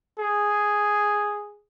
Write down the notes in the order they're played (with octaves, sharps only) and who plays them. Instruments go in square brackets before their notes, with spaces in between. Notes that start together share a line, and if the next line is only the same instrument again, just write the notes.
[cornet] G#4